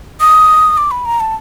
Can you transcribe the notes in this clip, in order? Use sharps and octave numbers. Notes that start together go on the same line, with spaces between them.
D#6
D6
B5
A#5
A5